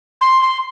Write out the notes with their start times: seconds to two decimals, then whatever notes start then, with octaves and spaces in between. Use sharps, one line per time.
0.21 C6
0.42 C6